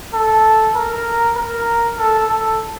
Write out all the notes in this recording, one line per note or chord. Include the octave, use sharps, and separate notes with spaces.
A4
A#4
A#4
A4
A4